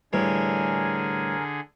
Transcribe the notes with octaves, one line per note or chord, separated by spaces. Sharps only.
A2 D3 E3 G3 G#4 A#4 G#5